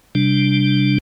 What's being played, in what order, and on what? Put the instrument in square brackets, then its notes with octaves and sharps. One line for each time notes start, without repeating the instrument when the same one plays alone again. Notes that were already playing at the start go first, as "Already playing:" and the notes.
[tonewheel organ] C3 G3 D4